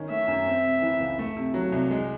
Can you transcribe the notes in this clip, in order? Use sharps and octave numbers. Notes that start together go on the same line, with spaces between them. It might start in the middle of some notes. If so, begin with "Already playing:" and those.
Already playing: D#3 C#4
A3 E5
F#2
C4
C3
E3
C#2
A3
C3
F#3
C2
G#3